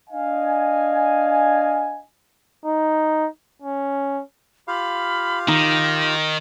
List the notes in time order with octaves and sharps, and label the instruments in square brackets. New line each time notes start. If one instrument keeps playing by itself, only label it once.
[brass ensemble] D4 D#5 F5 G#5
[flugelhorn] D#4
C#4
[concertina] F4 G4 F5 [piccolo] B5
[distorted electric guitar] D#3 [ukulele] D#4 [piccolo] A#6